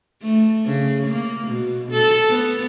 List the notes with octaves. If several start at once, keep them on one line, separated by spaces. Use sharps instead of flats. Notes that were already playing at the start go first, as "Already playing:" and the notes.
A3
C#3
A#3
B2
A4
B3